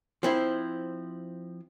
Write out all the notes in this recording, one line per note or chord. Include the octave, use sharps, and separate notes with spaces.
F3 C4 E4